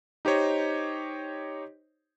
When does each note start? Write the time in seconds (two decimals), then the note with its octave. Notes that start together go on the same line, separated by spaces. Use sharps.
0.25 D#4 G4 C5 C#5 D#5